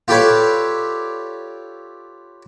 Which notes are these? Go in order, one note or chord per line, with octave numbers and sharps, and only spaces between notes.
F4 G4 A4 B4 C#5 D5